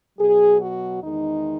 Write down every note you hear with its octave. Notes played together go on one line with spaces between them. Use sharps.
B2 F#3 G#4
F#4
E2 D#3 G#3 D#4